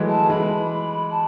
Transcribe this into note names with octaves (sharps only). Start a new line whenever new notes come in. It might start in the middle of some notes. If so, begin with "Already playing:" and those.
Already playing: E3 F#3 G#3 A3
A5
E3 G#3 B5
A5